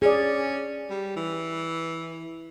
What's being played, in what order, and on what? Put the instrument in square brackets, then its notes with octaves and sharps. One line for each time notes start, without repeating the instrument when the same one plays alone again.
[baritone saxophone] C#4 [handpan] G#4 D5
[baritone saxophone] G3
E3